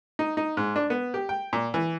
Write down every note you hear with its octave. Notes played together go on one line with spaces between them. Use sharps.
D#4
D#4
G#2
D4
B3
G4
G5
A#2
E3